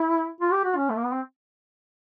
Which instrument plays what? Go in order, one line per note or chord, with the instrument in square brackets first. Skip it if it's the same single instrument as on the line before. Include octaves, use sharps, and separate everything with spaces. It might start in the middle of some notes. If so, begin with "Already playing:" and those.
Already playing: [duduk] E4
F4
G4
F#4
C#4
A3
A#3
B3
C4